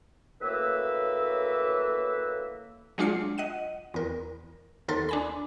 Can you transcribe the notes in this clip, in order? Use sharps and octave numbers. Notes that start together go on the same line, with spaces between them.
F#2 A2 A#3 B4 E5 E6
F#3 G#3 D4 F4 C7 C#7
D#5 F#5 D#7
E2 A#4
D#2 A4 A#4 C6 A6
D4 G#5 B5